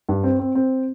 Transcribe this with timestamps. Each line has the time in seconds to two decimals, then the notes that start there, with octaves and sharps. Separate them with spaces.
0.09 G2
0.24 C4
0.39 C4
0.55 C4